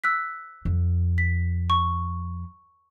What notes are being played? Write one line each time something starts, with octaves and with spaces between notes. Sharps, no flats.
E6 F#6 B6
F2
B6
C#6